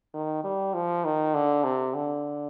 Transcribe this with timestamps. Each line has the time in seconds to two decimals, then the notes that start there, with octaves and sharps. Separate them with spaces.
0.14 D#3
0.44 G3
0.74 F3
1.05 D#3
1.34 D3
1.64 C3
1.94 D3